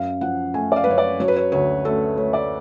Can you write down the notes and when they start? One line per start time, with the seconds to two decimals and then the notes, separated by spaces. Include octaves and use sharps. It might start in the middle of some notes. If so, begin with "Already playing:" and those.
Already playing: F#2 F5
0.21 F3 F#5
0.54 A3 G#5
0.72 D5
0.76 F5
0.84 B4
0.87 F#2 C#5
0.98 D5
1.20 F#3 C#5
1.28 B4
1.36 C#5
1.52 D2 C#5
1.85 A3 A4
2.17 A3 C#5
2.33 D5